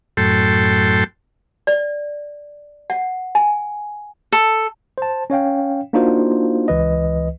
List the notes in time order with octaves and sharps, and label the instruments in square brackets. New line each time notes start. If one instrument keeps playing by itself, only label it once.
[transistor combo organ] F#2 A2 A4 G5 C6
[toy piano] D5
F#5
G#5
[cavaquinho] A4
[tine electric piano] C5 A5
C#4 C#5 F5 G5
A#3 D4 D#4 F4 F#4 C5
C#2 E3 B4 D#5